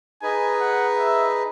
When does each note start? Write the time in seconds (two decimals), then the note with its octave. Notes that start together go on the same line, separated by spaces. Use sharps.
0.22 D#4 G#4 B4 D#5 G#5
0.60 F#5
0.98 E5